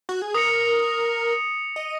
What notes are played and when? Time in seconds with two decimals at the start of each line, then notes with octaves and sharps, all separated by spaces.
0.09 F#4
0.22 G#4
0.34 A#4 D#6 A#6 C#7
1.76 D#5